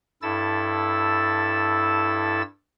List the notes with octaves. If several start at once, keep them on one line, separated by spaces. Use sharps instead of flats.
G2 E4 A4 E6 A6